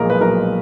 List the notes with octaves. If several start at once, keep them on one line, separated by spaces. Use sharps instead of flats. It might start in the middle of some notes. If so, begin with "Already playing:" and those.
Already playing: B1 A#2 F3 G#3 A#4
B4
B1 A#4